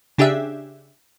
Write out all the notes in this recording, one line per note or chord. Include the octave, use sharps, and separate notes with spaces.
C#3 D4 G4 G#4 E5